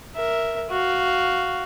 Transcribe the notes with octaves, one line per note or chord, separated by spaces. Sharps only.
A#4 E5
F#4 F5